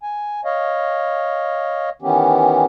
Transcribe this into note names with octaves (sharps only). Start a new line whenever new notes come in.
G#5
C#5 D#5 F5
D#3 E3 B3 C#4 G4